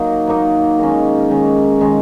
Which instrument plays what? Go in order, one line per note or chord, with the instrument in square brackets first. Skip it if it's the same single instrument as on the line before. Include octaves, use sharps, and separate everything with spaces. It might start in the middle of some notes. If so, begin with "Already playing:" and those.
Already playing: [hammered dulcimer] F#3 A#3 D#4
F#3 A#3 D#4
D#3 G#3 C#4
D#3 G#3 C#4
D#3 G#3 C#4